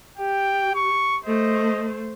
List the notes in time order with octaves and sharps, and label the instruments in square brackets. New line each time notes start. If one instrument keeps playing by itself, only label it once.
[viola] G4 [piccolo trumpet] G5
[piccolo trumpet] C#6
[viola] A3 C5 [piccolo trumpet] D#5